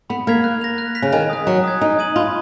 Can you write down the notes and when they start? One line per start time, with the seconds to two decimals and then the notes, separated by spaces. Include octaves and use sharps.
0.10 B3 B5
0.27 A#3 F6 G#6 B6 F7
0.44 F#6
0.61 A#6 F7
0.78 F#6
0.95 B6 F7
1.02 C#3
1.12 D#3 G#5
1.30 D#6 F#6
1.47 F#3 A#5
1.64 D#6 G#6
1.81 D#4 G#5
1.99 D#6 G#6 D#7 F#7
2.16 F4 B5